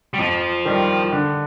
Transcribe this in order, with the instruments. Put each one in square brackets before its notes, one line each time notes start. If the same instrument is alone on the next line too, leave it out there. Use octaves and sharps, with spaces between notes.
[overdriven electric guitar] G3
[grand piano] F2 [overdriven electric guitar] F3
[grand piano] D#3 G3
D3